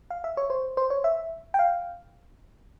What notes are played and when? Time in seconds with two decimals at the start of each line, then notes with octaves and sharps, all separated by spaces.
0.10 F5
0.24 E5
0.37 C#5
0.50 C5
0.77 C5
0.90 C#5
1.04 E5
1.54 G5
1.59 F5